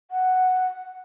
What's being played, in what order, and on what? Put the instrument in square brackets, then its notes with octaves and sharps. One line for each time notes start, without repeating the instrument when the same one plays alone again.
[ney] F#5